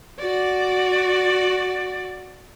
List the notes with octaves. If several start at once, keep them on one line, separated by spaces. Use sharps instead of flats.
F#4 D5